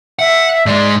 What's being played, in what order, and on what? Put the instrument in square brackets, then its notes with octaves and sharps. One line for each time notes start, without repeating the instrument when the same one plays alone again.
[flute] E5 [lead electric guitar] F#5
[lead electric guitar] G#2 G#3 [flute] D5